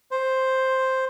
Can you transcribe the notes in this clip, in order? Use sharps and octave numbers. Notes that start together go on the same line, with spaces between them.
C5